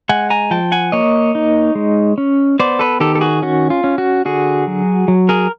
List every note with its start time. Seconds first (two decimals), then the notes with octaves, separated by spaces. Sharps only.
0.09 G#3 F#5 G#5
0.30 G#5 A#5
0.51 F3 G5 A5
0.72 F#5 G#5
0.92 A#3 C#5 D#5
1.35 D#4
1.75 G#3
2.18 C#4
2.59 B3 C5 D5
2.79 A4 B4
3.00 D#3 G4 A4
3.15 A4
3.21 F#4 G#4
3.42 C#4 F#4
3.70 F4
3.84 C#4
3.98 F#4
4.25 D3 F#4 G#4
4.67 F#3
5.08 F#3
5.29 G#4 A#4